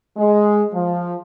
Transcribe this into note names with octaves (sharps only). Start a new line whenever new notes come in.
G#3
F3